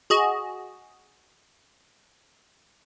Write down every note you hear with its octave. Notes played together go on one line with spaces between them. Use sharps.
F#4 G#4 D#5